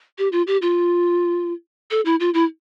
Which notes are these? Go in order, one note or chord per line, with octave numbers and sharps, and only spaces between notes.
G4
F4
G4
F4
A4
E4
F4
E4